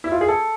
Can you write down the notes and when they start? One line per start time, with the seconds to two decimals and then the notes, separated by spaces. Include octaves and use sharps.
0.04 E4
0.12 F4
0.21 G#4
0.28 A4